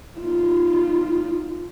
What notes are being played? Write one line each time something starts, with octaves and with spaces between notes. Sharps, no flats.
D#4 F4